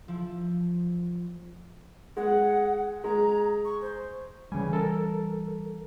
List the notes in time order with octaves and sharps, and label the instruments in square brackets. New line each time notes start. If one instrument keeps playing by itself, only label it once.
[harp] F3 E4
[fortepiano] G#3 [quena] F#5
[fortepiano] G#3 [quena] A#5
[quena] C#6
C5
[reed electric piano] C#3 G#5 [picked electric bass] E3 G3
[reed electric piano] A4 A#4